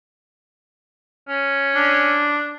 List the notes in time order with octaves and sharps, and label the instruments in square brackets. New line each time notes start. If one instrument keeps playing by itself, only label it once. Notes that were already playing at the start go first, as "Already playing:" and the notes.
[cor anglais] C#4
[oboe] D4